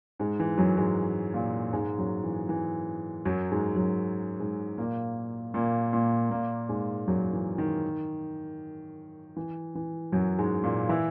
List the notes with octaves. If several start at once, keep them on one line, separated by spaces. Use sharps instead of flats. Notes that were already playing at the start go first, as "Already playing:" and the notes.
G#2 G#3
E3
F#2 F#3
G#2 G#3
A#2 A#3
G#2 G#3
F#2 F#3
E3
E3
F#2 F#3
G#2 G#3
F#2 F#3
G#2 G#3
A#2 A#3
A#2 A#3
A#2 A#3
A#2 A#3
G#2 G#3
F#2 F#3
E3
D#3
E3
E3
F#2 F#3
G#2 G#3
A#2 A#3
E3 E4